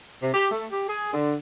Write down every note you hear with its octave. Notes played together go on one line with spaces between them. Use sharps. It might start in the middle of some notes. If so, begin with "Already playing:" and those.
C3
G4
A3
G4
G#4
D3